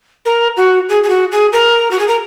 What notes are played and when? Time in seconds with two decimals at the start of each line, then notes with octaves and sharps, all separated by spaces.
0.25 A#4
0.56 F#4
0.89 G#4
1.03 G#4
1.09 F#4
1.31 G#4
1.52 A#4
1.91 F#4
1.99 G#4
2.08 A#4